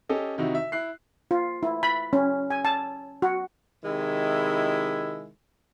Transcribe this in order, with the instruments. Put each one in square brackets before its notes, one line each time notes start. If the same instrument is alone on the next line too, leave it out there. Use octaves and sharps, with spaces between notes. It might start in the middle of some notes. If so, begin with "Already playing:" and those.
[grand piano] C#4 G4 A4 D#5
C3 D#3 D#4 E4 F#4
E5
E4 F#6 C7
[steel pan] F4
E4
B5
C#4
G#5
A5
F#4
[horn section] C3 D#3 G#3 E4